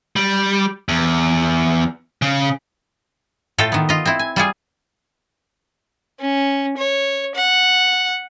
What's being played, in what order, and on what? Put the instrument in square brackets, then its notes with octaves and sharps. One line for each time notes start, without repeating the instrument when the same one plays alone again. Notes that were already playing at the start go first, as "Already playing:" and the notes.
[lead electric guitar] G3
E2
C#3
[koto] A2 F4 A4 G5
D#3 B3
F4 D#5
C4 E4
G#5
G3 F4 G#4
[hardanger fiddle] C#4
C#5
F#5